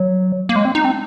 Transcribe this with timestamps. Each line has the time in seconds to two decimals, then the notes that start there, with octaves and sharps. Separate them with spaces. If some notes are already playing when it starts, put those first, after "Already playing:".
Already playing: F#3
0.49 A#3
0.56 G#3
0.65 C4
0.75 D#4
0.85 C4